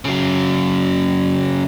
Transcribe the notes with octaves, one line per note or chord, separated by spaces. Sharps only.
C#3 F#3